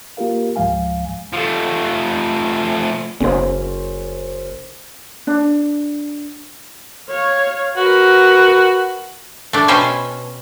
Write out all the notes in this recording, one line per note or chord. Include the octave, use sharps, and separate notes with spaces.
A#3 F4 G4 A#4 F5
C#2 G#2 F3 G#3 F5 G#5
F3 A3
F#1 C#4 C5
D4
C#5 F5
F#4 A#4 B4
A3 D4
B2 C#4 C5 G5 G#5